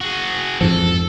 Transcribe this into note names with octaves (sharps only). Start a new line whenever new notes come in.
F#4 G#4
F2 G#2 F3 A4